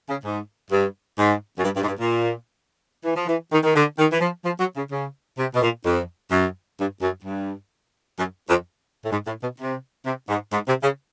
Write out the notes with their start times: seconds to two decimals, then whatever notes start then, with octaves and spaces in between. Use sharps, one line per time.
0.09 C#3
0.25 G#2
0.71 G2
1.19 G#2
1.58 F#2
1.65 G2
1.76 G2
1.83 G#2
1.88 G2
1.99 A#2
3.04 E3
3.16 F3
3.27 E3
3.52 D#3
3.64 D#3
3.75 D3
3.99 D#3
4.12 E3
4.21 F3
4.44 F3
4.60 F#3
4.77 C#3
4.92 C#3
5.38 C3
5.54 B2
5.62 A#2
5.85 F2
6.31 F#2
6.79 G2
7.02 F#2
7.25 G2
8.19 F#2
8.49 F2
9.05 A2
9.12 G#2
9.27 A2
9.43 B2
9.59 C3
10.06 C3
10.29 G#2
10.52 G#2
10.68 C3
10.83 C#3